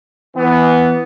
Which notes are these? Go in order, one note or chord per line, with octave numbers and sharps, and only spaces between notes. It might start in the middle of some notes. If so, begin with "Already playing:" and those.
E3 B3